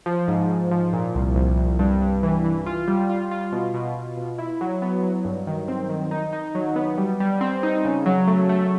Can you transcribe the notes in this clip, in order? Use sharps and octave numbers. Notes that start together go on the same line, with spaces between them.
F3
G#2
G#2
F3
A#2
C2
C2
C2
G2
G2
E3
E3
F4
G3
F4
F4
B2
B2
B2
B2
E4
F#3
B3
F#3
G2
D#3
C4
D#3
D#4
D#4
F#3
B3
G3
G3
C4
D#4
C#3
F#3
A3
A3